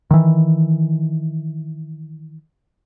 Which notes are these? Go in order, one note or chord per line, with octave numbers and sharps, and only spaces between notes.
D#3 E3